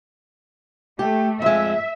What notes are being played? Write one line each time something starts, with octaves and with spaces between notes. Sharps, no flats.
A3 G4
F2 G#3 E5